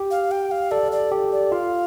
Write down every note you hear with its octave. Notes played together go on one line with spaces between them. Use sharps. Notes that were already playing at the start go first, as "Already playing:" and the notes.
Already playing: G4
F5
G5
F5
A4 D5
D5
G4
D5
F4 F5